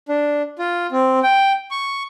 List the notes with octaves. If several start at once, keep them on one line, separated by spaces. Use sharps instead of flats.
D4
F4
C4
G5
C#6